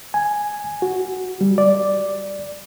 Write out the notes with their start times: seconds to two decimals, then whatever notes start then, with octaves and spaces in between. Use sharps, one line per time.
0.14 G#5
0.82 F#4
1.41 G3
1.58 D5